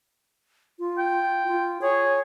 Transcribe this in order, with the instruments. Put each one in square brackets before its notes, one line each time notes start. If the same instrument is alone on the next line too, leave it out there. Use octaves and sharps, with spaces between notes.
[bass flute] F4
[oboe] G5
[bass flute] F4
[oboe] G#4 [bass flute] C#5